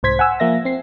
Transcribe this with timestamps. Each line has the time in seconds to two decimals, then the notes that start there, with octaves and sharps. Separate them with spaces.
0.03 C2 G#2 C5 G#6 B6
0.19 F#5 G#5 E6
0.40 F3 A#3 E5 A#6
0.65 C4 C7